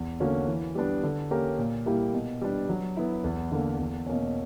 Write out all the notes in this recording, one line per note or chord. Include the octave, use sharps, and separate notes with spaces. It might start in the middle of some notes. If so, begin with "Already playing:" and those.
Already playing: E2
D3 A#3 C#4 F#4
E3
G3 B3 D4
D3
A#3 C#4 G4 A#4
A#2
G3 A#3 E4 G4
B2
G3 B3 D4
F#3
B3 E4
E2
D3 A#3
E2
B2 A#3 C#4